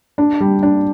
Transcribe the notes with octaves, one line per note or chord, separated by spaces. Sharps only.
D4
G3
D4